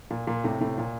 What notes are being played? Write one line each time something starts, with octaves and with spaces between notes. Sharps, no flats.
A#2
A#2
A2 C3
A2 C3
A#2